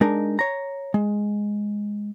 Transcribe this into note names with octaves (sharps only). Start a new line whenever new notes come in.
G#3 D4 D#4 A#4
C#5 A#5
G#3